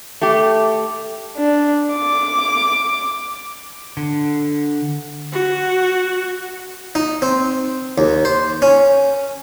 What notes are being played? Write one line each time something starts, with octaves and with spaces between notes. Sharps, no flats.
A3 G4
D4
D6
D3
F#4
D#4
C4
D#2
C5
C#4